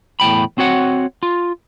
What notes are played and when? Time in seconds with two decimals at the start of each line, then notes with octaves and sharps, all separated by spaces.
0.20 E2 A2 G5 B5
0.58 C4 F#4 C#5 F#5
1.23 F4